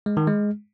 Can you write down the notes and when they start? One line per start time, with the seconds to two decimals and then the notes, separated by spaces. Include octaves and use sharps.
0.06 G#3
0.17 D#3
0.28 G#3